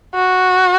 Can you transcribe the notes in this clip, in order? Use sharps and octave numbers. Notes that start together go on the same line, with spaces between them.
F#4